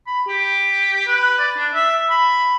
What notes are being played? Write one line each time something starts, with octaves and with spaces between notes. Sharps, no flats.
B5
G4
B4
D5
D4
E5
B5